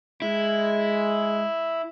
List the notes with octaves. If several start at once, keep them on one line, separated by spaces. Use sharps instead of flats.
G#3 E4